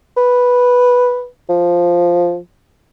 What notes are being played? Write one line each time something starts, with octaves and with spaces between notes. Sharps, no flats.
B4
F3